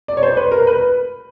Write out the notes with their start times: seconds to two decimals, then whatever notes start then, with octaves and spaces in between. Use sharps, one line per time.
0.08 D5
0.17 C#5
0.23 C5
0.37 B4
0.52 A#4
0.67 B4